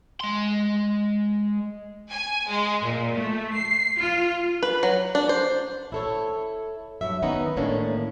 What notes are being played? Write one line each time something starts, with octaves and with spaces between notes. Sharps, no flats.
G#3 C6
G#5
G#3
A#2
A3
C7
F4
B4
F#3
D4
C5
E4 A4 C#5
G2 F#3 E5
D#3 B3 C#4 D#4
A2 D#3 A#3 C#4 D4